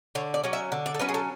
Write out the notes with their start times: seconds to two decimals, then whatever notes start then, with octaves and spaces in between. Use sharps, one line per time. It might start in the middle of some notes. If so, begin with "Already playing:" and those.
0.15 D3 C#5
0.34 D5
0.44 F#3 C#4
0.53 E5
0.72 D3
0.86 D5
0.94 A4
1.00 F#3 C#4 B4
1.09 G#4
1.14 A4